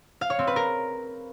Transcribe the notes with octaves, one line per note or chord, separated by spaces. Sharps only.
F5
C#5
C4
B4
A#4